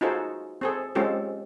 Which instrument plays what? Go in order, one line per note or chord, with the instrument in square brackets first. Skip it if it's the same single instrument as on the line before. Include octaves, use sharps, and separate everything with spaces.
[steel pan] D#4 F4 F#4 G#4 A4 C5
C4 G#4 A4
G#3 C4 C#4 F4 G4 A4